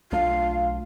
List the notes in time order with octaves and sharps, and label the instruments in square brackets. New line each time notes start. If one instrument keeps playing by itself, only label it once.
[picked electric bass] B1 A3 D4 [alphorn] F4 [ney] F5